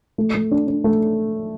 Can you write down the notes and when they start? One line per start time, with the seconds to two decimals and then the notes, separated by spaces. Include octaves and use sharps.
0.18 A3
0.34 A3
0.51 D4
0.68 D4
0.84 A3